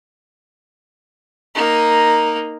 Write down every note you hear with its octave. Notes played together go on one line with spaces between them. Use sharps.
A#3 D#4